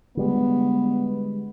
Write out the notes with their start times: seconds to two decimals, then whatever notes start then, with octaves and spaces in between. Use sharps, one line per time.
0.17 D3 G3 G#3 B3